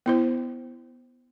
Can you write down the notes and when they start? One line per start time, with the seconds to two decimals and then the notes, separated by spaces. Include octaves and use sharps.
0.06 B3 E4 C5